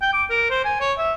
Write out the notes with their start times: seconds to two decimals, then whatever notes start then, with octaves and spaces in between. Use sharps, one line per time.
0.02 G5
0.13 D6
0.30 A#4
0.50 C5
0.65 G#5
0.80 C#5
0.98 E5